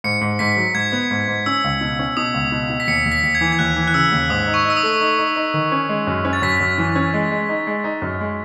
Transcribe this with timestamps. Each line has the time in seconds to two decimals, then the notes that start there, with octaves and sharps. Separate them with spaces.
0.04 G#2 C#7
0.21 G#2
0.39 G#2 B6
0.56 F#3
0.74 G#2 G#6
0.92 B3
1.11 G#2
1.28 G#2
1.46 C#4 E6
1.64 C#2
1.81 B2
1.99 C#4
2.17 B2 D#6
2.34 C#2
2.52 B2
2.70 B2
2.80 B6
2.88 D#2 C#7
3.06 D#2
3.12 B6
3.23 D#2
3.35 G#6
3.41 E3
3.52 G#6
3.59 D#2 F#6
3.76 E3
3.87 F#6
3.94 C#3 E6
4.12 D#2
4.30 G#2 D#6
4.47 D#4
4.54 C#6
4.65 D#4
4.70 E6
4.77 D#6
4.83 A3
5.01 D#4
5.18 D#4
5.36 D#4
5.54 D#3
5.72 C#4
5.89 G#3
6.07 F#2
6.25 C#4
6.33 A6
6.42 F#2 B6
6.60 F#2
6.78 E3
6.95 C#4
7.14 G#3
7.31 G#3
7.49 D#4
7.67 G#3
7.84 D#4
8.02 F#2
8.20 G#3